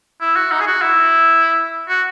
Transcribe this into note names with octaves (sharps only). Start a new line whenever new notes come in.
E4
F#4
D#4
G#4
F#4
E4
F#4